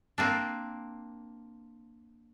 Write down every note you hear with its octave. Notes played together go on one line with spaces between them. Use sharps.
A#3 C4 D4